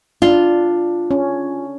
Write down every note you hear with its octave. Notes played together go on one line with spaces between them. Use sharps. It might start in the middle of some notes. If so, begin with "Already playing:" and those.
D4 F4
C#4